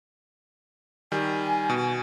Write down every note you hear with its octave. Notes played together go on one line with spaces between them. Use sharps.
D#3 G3 G#5
B2